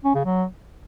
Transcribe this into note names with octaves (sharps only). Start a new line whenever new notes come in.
C#4
C#3
F#3